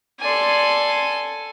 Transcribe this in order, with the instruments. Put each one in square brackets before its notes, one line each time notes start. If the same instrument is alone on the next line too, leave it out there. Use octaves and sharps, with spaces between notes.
[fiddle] A4 G#5 [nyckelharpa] D5 C6